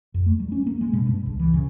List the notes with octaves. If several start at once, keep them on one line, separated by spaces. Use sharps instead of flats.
F2
A3
G3
C#4
A#3
G#3
B2
G2
C#2
E3
C#3